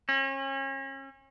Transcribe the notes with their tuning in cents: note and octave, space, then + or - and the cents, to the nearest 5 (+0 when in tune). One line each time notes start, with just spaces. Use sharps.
C#4 -35